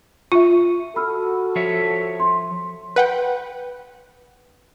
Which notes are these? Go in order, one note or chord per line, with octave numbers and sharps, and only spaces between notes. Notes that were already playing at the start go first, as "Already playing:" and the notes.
F4 E5 C#6 D#7
F#4 A4 B5 E6 F6
F3 C#5 E5
C6
B4 F#5 G5